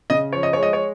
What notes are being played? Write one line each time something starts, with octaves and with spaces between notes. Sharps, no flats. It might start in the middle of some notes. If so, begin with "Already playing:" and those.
C#3 D#5
F3 C#5
D#5
G#3 C#5
D#5
C#5